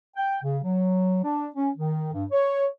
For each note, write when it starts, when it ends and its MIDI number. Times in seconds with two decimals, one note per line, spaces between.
0.17 0.38 79
0.43 0.58 49
0.63 1.19 54
1.23 1.48 62
1.56 1.69 61
1.77 2.12 51
2.13 2.25 43
2.32 2.66 73